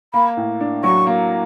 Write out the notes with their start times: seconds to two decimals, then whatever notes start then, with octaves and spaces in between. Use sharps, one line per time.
0.13 A#3 B5
0.37 A2
0.61 D4
0.84 F#3 C#6
1.07 A#3